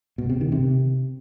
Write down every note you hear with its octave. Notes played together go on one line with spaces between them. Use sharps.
B2
C3
D#3
C3